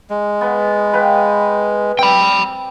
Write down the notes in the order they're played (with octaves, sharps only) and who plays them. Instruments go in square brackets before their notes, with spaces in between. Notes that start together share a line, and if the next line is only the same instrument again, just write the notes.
[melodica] G#3
[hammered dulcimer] B3
B4 F5 G5
[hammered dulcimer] C4 [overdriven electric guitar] G5 B5